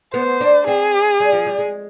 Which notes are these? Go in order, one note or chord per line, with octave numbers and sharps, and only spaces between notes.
B3 C5
D4
C4 G#4
G3
F3
G3
G#3